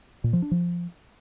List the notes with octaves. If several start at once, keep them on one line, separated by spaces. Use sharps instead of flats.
A#2
F3
D4
F3